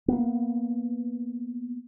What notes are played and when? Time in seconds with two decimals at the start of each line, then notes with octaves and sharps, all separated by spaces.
0.08 A#3 B3